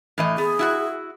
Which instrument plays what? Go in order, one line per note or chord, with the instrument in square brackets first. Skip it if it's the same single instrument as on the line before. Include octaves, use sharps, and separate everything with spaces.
[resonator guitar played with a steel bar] A2 E3 D#5
[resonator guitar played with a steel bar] B3 [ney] G#4
[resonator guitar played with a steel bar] E4 F#4 F#5